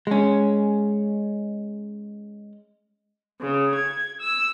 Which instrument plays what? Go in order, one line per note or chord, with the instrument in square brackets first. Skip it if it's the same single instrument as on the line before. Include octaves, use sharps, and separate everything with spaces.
[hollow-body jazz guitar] G#3 C#4
[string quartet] C#3
G#6
E6